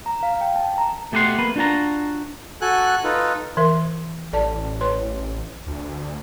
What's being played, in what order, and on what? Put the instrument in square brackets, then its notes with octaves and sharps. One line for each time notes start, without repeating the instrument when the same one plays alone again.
[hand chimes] A#5
F5
G5
A5
A#5
[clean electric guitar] B2 A3 G4 D#5 F#5 C6
A#3 B4
D4 F4 F#4 A5 A#5
[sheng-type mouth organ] F#4 A4 G#5 F#6
D#4 F4 A4 B4
[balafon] E3 A#4 E5
[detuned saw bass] A1 [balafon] A4 D5 A5
[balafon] B4 C#5 C6
[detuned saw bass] D2